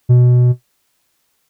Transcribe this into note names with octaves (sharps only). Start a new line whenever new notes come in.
B2